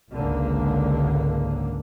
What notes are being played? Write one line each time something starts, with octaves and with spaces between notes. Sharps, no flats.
G#1 C#2 D3 A#3